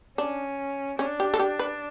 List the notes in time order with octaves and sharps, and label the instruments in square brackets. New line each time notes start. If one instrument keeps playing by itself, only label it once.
[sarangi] C#4 [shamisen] D4
[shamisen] C#4 [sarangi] D4
[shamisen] G4
A4
G4
B4